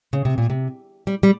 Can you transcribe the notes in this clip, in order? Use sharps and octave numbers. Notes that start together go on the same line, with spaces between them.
C#3
C3
A#2
C3
G3
G3